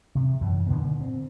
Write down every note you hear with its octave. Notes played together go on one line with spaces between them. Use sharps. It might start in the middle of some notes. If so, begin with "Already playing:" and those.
C3
F#2 E3
A#2 D3 D#3 B3
C4